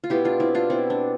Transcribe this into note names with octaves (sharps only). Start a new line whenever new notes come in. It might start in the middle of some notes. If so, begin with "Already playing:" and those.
F4
B2 B3 E4 G4
D4 F4
C4 E4
D4 F4
B2 B3 C4 E4
D4